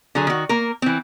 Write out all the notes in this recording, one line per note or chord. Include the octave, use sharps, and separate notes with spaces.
D3 F#3 G#4
D#3 F#4
A#3 A#4
E3 C4